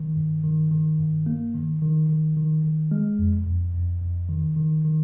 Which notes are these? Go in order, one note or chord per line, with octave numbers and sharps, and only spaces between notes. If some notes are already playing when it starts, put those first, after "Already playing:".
Already playing: D#3
G2
D#3
D#3
G2
A#3
D#3
D#3
D#3
D#3
D#3
G#3
F2
F2
F2
F2
D#3
D#3
D#3